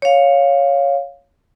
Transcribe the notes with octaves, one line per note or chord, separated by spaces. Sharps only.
C#5 F5